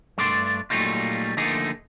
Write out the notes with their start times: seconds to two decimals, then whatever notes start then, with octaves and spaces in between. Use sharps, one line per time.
0.18 G2 A3 D4 D5 C6
0.70 A#2 F#3 G3 A3 D#4 F4
1.37 D3 F3 A3 A#3 D#4 G#4